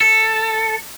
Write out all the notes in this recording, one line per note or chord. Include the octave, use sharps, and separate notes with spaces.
A4